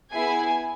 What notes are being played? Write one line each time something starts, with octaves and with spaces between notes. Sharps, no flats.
B3 E4 G#4 G#5